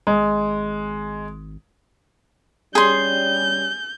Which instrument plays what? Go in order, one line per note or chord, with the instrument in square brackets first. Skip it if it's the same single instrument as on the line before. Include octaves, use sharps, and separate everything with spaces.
[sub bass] G#1 [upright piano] G#3
[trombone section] G3 C#4 [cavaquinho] G#4 C6 [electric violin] G6